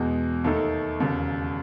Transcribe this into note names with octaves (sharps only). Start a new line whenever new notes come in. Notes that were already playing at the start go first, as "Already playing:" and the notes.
Already playing: E2 B2 G#3
D#2 D#3 A3 D#4 A4
E1 D#2 C#3